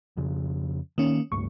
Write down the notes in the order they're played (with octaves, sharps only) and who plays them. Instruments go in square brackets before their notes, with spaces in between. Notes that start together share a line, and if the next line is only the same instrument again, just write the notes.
[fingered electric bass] F2 C#3
[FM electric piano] D#3 C#4 [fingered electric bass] A#3
[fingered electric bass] C#2 G2 A3 [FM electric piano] C#6